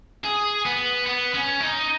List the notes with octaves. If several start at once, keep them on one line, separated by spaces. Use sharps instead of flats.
G#4
B3
B3
C#4
D#4